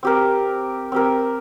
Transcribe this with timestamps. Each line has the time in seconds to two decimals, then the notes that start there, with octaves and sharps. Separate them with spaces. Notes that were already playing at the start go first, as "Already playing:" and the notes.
0.03 C4 G4 A#4
0.92 C4 G4 A#4